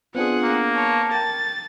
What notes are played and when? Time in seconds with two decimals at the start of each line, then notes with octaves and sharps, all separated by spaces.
0.15 B3 C4 D4 F4 G#4 F#5
0.43 A#3
0.75 C#5 A5
1.11 A#4 G5 A6